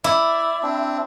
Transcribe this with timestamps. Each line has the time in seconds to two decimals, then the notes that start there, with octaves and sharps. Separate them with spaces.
0.04 E4 D5
0.63 C4 D4